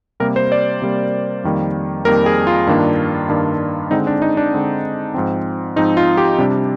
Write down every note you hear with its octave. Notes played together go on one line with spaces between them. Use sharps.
C3 G3 A#3 A#4
C5
D5
C3 G3 A#3
F2 D#3 G3 A#3
F2 D#3 G3 A#3 A#4
G#4
F4
G2 D#3 A#3 D4
G2 D#3 A#3 D4
D3 G#3 C4 D#4
D4
D#4
D4
D3 G#3 C4
G#2 F3 C4
G#2 F3 C4 D#4
F4
G4
C3 G3 D4